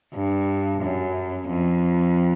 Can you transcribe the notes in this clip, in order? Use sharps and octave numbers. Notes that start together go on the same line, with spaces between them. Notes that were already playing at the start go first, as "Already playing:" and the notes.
G2
F#2
F2